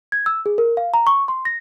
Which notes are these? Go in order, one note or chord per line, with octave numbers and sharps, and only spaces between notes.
G#6
E6
G#4
A#4
F5
A#5
C#6
C6
A#6